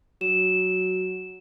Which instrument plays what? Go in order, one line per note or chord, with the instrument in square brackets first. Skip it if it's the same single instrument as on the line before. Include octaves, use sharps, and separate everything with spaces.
[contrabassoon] F#3 [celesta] E7